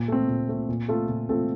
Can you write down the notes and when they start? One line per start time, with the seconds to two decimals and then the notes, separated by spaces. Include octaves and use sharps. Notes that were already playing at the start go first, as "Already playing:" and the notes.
Already playing: A#2
0.08 A3 C4
0.28 A#2
0.49 A3 C4
0.69 A#2
0.88 A3 C4 F4 A4
1.09 A#2
1.29 A3 C4 F4 A4